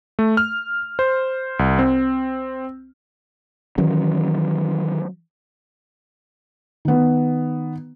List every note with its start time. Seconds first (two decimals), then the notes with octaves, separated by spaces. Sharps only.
0.19 A3
0.37 F6
0.99 C5
1.59 C2
1.79 C4
3.78 D#3 E3 F#3 C#4
6.85 D#3 B3